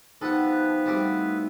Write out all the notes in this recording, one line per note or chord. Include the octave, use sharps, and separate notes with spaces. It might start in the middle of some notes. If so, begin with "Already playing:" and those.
F3 G3 B3 D#4 A4 B4 F#5
B2 G3 A3 C4 E4